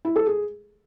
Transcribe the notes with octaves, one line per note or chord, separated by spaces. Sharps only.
E4
A4
G#4